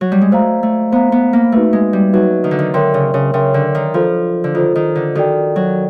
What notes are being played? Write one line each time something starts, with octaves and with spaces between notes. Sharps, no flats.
F#3
G3
G#3
A3 C5 F5 A#5
A3
B3 C5 F5 A#5
B3
A#3
A3 D#4 F#4 B4 E5
G#3
G3
F#3 D#4 F#4 B4 E5
D#3
D3
D#3
D3 A#4 C#5 E5 G5 C6
C#3
C#3
C#3 A#4 C#5 E5 G5 C6
D3
D#3
F3 F4 A4 C5
D3
D#3 F4 A4 C5
D#3
D3
D#3 F#4 A4 D5 G5
F#3